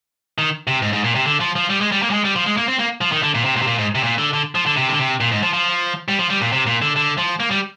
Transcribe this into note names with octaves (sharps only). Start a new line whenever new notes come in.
D#3
C3
G#2
G#2
A#2
C3
D3
F3
F3
G3
G#3
G3
A#3
G3
G#3
G3
F3
G#3
A#3
C4
A#3
F3
D#3
D3
A#2
C3
A#2
C3
A#2
G#2
C3
A#2
D3
D3
F3
D3
C3
D3
C3
A#2
G#2
F3
F3
G3
F3
G3
A#2
C3
A#2
D3
D3
F3
A#3
G3